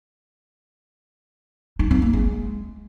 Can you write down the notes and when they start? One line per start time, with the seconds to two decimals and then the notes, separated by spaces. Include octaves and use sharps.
1.79 D#4
1.91 C4
2.02 A#3
2.13 G#3